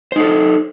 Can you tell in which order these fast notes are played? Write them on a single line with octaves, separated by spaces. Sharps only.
C5 D#4 A4